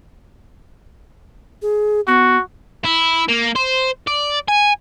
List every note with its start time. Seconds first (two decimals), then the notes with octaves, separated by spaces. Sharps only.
1.62 G#4
2.07 B3 F#4
2.85 E4
3.28 A#3
3.56 C5
4.07 D5
4.48 G#5